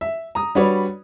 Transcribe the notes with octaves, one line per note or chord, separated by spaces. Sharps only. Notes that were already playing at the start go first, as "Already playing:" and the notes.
E5
A#5 D#6
G3 D4 F#4 B4 C#5 D5